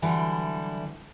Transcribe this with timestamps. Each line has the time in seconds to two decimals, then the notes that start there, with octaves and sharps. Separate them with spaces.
0.02 D3 E3 F#3 G3 E4